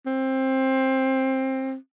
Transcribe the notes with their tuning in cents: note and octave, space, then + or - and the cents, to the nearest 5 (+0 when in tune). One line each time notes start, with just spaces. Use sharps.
C4 +15